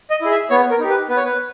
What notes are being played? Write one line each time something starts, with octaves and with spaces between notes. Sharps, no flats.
D#5
E4 G#4
E5
B3 C#5
A#4
D#4 G4
B4
B3 B4
C#5
B4